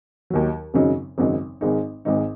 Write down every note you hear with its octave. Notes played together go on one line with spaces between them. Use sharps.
D#2 D#3 F#3
G#1 F#2 C#3 F#3 D#4
G#1 F#2 C#3 F#3 D#4
G#1 G#2 G#3 D#4
G#1 G#2 G#3 D#4